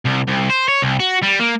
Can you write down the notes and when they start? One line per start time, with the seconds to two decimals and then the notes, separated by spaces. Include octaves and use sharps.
0.06 C2
0.28 C2
0.50 C5
0.68 C#5
0.82 C2
1.00 F#4
1.23 G3
1.40 A#3